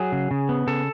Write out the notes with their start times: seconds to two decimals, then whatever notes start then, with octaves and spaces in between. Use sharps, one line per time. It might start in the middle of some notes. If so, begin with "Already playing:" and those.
Already playing: F#3 G#4
0.12 C#3
0.31 C#3
0.49 B3
0.67 C#3 A4